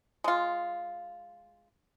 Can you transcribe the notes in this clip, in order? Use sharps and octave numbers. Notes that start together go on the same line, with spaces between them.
G#3 F4